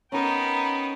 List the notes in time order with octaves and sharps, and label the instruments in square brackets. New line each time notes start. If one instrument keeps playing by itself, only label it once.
[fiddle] B3 D#4 [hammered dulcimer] C#4 A#4 [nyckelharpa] G5 B5 [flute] A#5